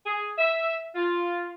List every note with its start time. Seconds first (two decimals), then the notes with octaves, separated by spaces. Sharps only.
0.06 G#4
0.38 E5
0.95 F4